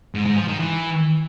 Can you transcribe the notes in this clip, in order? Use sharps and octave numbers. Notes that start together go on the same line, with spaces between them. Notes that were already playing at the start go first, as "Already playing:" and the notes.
G#2
G#2
F3
D#3
E3